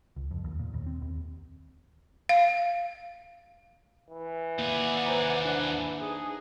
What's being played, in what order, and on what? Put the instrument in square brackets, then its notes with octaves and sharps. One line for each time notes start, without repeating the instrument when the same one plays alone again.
[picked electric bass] C#2
F2
D#2
A#2
D#2
C4
D#2
[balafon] F5
[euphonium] E3
[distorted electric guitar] D#2 G#4 [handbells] A#3 [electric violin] D5 F#5
[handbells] B4 C5 A#5
D4 F#6
[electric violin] D#4 G#4